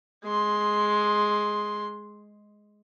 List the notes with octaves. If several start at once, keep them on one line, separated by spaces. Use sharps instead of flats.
G#3 C6